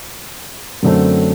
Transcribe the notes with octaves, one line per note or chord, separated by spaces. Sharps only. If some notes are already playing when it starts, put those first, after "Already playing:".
F#2 D3 F#3 A3 C4